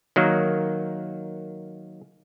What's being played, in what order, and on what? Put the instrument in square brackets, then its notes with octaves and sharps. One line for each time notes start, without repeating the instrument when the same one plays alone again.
[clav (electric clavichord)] D#3 F#3 A#3